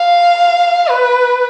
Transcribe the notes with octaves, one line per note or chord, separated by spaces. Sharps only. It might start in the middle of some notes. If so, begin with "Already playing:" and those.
Already playing: F5
B4